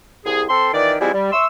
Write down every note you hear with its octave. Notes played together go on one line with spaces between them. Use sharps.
C2 G#4
C4 A4 C6
A#2 D#3 E3 D5
F3 G3 G#3 C4 E4
G3
E5 C6 C#6 E6